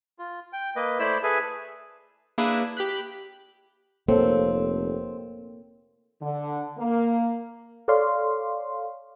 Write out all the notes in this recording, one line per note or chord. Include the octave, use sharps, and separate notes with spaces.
F4
G5
A#3 B4 D#5
A3 E4 C5 D5 B5 E6
G#4 A4 B4 E5 G#5
A#3 D4 E4 G#4 B4
G4 B5 F#6
F1 A#3 C4 A4 C#5
D3
A#3
A4 C#5 D5 F5 C6